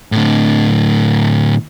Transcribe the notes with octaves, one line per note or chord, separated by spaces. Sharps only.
A2 D3